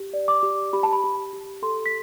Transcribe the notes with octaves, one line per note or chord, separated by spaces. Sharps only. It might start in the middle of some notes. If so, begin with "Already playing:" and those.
Already playing: G4
D5
D6
G4
G4 B5
A5
B5
G4
G4
A4 C6
B6